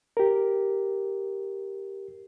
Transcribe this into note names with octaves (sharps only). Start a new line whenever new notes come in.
G4 A#4